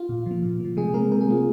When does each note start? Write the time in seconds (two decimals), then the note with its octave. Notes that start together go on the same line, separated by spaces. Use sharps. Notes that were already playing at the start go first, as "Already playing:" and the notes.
Already playing: F4
0.09 A#2
0.26 F3 A#3
0.42 A#2
0.60 F3 A#3
0.76 C3 G#3 G#4
0.93 G#3 A#3 C4 A#4
1.11 C3 A#4
1.21 G#4
1.28 G#3 C4 F4